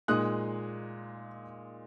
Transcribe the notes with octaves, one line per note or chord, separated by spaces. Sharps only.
A#2 G#3 D#4 D#6 F#6